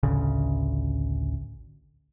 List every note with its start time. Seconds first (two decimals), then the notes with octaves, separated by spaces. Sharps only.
0.03 A1 D2 C#3